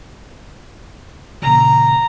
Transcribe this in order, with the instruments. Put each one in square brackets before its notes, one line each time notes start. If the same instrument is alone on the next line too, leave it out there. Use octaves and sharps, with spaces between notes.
[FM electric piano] A#2 C#3 E3 [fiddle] A#5